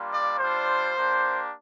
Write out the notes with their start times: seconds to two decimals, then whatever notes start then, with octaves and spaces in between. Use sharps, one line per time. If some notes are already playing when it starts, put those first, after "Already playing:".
Already playing: G3 A#3 D4 F4
0.11 D5
0.39 G3 D4 F4 C5
0.96 A#3 D4 G4